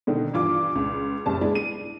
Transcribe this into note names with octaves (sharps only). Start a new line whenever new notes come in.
B2 D3 D#3
G2 E3 F4 D6
C#2
F#1 G3 A5
G#3 B3 D4 E4
D#7